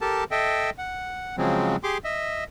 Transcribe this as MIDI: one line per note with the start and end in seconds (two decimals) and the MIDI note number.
0.01 0.24 67
0.01 0.24 69
0.01 0.24 70
0.01 0.24 81
0.31 0.70 69
0.31 0.70 75
0.31 0.70 76
0.31 0.70 79
0.78 1.36 78
1.38 1.76 49
1.38 1.76 53
1.38 1.76 54
1.38 1.76 56
1.38 1.76 60
1.83 1.98 67
1.83 1.98 68
1.83 1.98 84
1.83 1.98 86
2.04 2.44 75
2.04 2.44 76